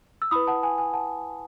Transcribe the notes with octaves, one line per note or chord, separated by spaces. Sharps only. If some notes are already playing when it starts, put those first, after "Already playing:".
E6
E4 B4 B5 D#6
F#5 A5
G#5
G#5
F#5 A5